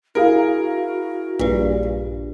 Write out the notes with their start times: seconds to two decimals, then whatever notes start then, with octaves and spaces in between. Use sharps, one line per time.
0.15 E4 F#4 G#4 A#4 F5
1.39 A#1 G2